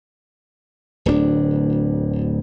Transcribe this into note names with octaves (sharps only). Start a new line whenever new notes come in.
D1 D2 C#4 D4